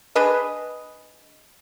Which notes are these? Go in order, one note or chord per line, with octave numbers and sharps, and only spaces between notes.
D4 G#4 B4 D#5